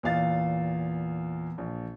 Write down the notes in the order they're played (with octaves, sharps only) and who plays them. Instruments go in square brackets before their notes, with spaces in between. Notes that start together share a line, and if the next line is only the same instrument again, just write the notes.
[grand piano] E2 A#2 F5 A6
A#1